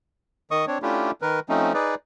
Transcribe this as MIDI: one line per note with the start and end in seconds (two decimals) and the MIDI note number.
0.51 0.65 51
0.51 0.65 75
0.51 0.65 85
0.51 0.65 87
0.67 0.78 60
0.67 0.78 62
0.67 0.78 73
0.82 1.11 57
0.82 1.11 61
0.82 1.11 62
0.82 1.11 64
0.82 1.11 65
0.82 1.11 67
1.22 1.40 51
1.22 1.40 70
1.22 1.40 71
1.49 1.73 53
1.49 1.73 57
1.49 1.73 60
1.49 1.73 61
1.49 1.73 63
1.74 1.95 63
1.74 1.95 68
1.74 1.95 71
1.74 1.95 74